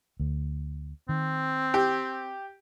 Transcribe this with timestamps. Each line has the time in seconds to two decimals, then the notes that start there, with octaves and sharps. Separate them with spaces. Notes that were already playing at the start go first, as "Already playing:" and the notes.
0.20 D2
1.09 D#3 C4
1.74 G4